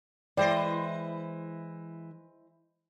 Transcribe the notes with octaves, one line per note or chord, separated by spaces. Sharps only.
E3 G#3 E4 C5 D5 D#5 G5